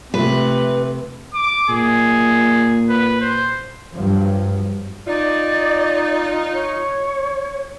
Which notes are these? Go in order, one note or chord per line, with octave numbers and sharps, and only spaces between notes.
C3 F3 A3 B4
D6
A#2 G#4
B4
C5
G2 F3 F#3
D#4 F4 D5
C#5